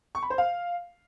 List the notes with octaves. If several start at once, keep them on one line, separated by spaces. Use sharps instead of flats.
C#6
B5
C5
F5